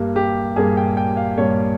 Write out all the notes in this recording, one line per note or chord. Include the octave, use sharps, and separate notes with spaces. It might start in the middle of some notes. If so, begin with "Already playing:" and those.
Already playing: G2 G3 A#3
G4
G2 G3 A#3 G#4
G5
G5
F5
G2 G3 A#3 C#5